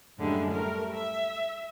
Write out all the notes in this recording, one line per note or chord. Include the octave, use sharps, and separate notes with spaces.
F#2 A2 D3 G3 G#3
G3 A3 A#4
E5